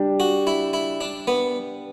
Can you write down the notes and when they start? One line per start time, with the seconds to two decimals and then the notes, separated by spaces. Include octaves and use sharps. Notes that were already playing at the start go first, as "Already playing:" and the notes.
Already playing: G3 D4 G4
0.20 F#4
0.47 E4
0.73 E4
1.01 D4
1.27 B3